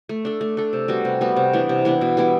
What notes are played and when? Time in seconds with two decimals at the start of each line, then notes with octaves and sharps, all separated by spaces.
0.09 A3
0.25 D4 A4
0.41 A3
0.57 D4 A4
0.73 C3
0.88 G3 B3 F#4
1.05 C3
1.21 G3 B3 F#4
1.37 C3
1.53 E3 B3 D4
1.69 C3
1.85 E3 B3 D4
2.01 B2
2.17 G3 B3 E4